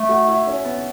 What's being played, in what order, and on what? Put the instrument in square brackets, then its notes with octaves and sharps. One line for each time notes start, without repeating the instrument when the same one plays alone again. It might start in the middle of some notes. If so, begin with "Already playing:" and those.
Already playing: [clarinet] A3
[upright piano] F#4
E4
C#4
B3